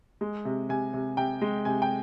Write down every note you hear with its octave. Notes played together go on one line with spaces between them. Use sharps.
G#3
C3
C3 G#5
C3
C3 G5
G#3
C3 G#5
G5